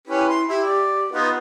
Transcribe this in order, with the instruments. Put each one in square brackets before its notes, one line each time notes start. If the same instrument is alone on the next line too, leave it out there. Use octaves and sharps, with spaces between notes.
[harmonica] C#4 G4 B4 [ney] E4
[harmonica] C6
[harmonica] E4 [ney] G4
[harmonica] D5
[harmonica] B3 D#4 F4 [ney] B4